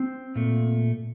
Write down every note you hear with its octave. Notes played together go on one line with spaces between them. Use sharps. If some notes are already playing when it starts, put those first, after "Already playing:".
Already playing: C4
A#2 A3